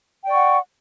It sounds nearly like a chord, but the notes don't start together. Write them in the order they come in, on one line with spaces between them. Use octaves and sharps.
G5 D5 C#6 F#5